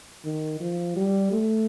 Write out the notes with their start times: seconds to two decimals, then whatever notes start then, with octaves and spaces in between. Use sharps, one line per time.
0.25 D#3
0.60 F3
0.96 G3
1.32 A3